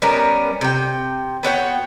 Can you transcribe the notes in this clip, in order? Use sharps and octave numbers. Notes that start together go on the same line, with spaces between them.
G3 B3 C#4 A#4
C3 G5
B3 F#4 C#5 G5